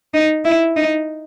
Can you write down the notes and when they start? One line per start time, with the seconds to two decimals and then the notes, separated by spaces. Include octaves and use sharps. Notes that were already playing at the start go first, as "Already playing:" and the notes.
0.14 D#4
0.45 E4
0.76 D#4